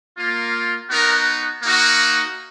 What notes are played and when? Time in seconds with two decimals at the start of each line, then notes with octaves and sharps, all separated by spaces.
0.17 A#3 F4
0.90 B3 D#4 F#4 A#4
1.63 A#3 D#4 F#4